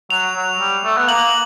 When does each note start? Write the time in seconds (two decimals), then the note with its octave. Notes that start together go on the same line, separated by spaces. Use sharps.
0.10 F#3 F7
0.35 F#3
0.60 G3
0.84 A3
0.97 B3
1.08 A#3 F#7